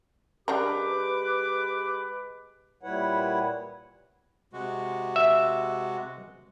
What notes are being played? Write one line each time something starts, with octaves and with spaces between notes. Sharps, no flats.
C#3 G#3 D4 G4 A#4 B4 D6
A#2 G3 E4 B4 C#5 F#5
C3 G#3 F#4
E5